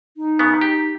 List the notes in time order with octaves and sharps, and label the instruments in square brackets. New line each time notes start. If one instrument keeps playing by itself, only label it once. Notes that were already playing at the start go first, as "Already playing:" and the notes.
[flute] D#4
[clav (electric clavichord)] C#3 B3
G4